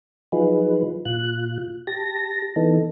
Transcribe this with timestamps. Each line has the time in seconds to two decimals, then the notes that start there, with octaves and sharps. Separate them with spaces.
0.32 F3 F#3 D#4 F4 G#4 B4
1.05 A#2 F4 F#6
1.87 G4 A5 A#6
2.56 E3 B3 D#4 A4